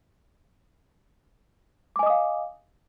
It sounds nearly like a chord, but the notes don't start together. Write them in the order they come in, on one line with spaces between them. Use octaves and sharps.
D6 G#5 D#5 D#6 F5